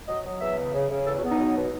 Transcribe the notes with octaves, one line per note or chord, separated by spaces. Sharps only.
F#3 D#5
F#3
E2 E5
C#3
C#3
C#3
E2 A4
F#4
B3
D#4
F#3
B2